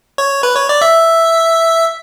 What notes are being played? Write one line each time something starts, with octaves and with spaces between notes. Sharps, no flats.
C#5
B4
C#5
D5
E5